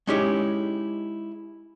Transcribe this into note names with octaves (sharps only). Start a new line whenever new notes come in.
G#3 C#4 D#4 E4 G4 C#5